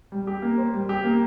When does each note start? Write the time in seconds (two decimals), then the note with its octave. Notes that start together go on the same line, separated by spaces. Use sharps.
0.12 G3
0.27 G4
0.42 A#3
0.58 C5
0.74 G3
0.89 G4
1.04 A#3